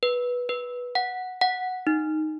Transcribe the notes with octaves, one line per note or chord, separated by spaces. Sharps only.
B4
B4
F#5
F#5
D#4